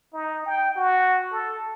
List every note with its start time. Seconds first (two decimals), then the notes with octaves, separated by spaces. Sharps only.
0.13 D#4
0.46 G5
0.76 F#4
1.32 A4